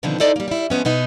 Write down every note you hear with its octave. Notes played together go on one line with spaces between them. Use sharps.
B2 D3 D#3 F3 B3 C4
D#4 E4 A4 C5 D5 D#5
G3 A#3
G3 E4
F3 G#3 B3 C#4
B2 B3 D#4